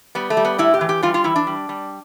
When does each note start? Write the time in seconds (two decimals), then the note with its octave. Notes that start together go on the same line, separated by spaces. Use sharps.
0.15 G3 B3
0.30 A3
0.37 G3
0.45 B3
0.58 A2 E4
0.74 G4
0.81 E3
0.89 G4
1.03 G3 F4
1.14 F4
1.24 E3 E4
1.36 D4
1.47 G3
1.69 G3